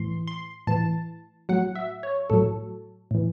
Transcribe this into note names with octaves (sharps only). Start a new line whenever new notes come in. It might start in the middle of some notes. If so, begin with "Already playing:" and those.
Already playing: A2 E3 C6
C6
A2 E3 A5
A2 F#3 F#5
E5
C#5
A2 F#3 A4
A2 E3